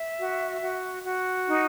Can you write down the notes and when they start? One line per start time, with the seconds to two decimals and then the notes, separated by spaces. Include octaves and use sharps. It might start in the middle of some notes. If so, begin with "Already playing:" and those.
Already playing: E5
0.18 F#4
0.62 F#4
1.04 F#4
1.48 D#4